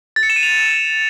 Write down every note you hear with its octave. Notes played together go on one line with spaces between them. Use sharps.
A6
C#7
E7
D#7
F7